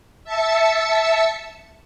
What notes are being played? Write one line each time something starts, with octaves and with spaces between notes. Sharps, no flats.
E5 A5 E6 C#7